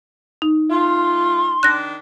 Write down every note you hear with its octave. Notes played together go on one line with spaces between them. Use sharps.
D#4
A3 F4 C6
D#3 D4 F#6 A#6